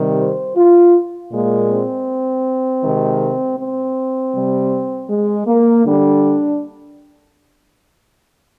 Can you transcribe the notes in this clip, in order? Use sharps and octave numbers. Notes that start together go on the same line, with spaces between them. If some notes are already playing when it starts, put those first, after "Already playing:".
Already playing: C3 D#3 G3
C5
F4
A#2 G#3 A#3
C4
C3 D#3 G#3
C4
C3 G3
G#3
A#3
D3 G3 D4